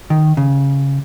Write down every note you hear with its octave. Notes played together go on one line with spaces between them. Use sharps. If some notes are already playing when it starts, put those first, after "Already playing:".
D#3
C#3